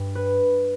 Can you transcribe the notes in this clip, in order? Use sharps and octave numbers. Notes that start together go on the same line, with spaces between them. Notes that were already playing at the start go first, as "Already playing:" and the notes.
Already playing: G2
B4